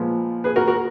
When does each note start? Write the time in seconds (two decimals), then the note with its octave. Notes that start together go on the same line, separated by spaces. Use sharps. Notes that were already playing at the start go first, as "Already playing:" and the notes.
Already playing: A#2 F3 G#3 B3
0.44 G#4 B4
0.56 F#4 A#4
0.67 F#4 A#4